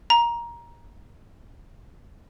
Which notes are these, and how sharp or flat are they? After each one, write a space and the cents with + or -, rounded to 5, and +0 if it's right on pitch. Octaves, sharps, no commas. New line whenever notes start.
A#5 +15